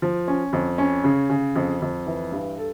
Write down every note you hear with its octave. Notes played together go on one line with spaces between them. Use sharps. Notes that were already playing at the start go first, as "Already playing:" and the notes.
F3
C#4
F2
C#4
C#3
C#3
F2
F2
E3
G2
A4